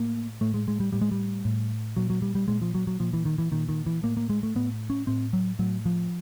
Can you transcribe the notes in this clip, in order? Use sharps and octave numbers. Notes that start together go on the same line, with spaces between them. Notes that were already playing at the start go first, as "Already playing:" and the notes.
Already playing: A2 A#3
A2 A3
G#3
G#3
G3
A2 G3
G#3
G3
A2
A#2 F#3
F#3
G3
G3
A#2 G#3
F3
F#3
F#3
A#2 F3
E3
D#3
E3
A#2 D#3
D#3
E3
A2 A#3
A#3
G#3
A3
A2 B3
C#4
A2 C4
F#3
A2 F#3
F3